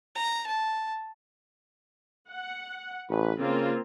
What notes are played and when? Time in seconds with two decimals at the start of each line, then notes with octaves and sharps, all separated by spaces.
0.15 A#5
0.46 A5
2.30 F#5
3.10 A1 B4
3.40 C#3 A#3 C4 F4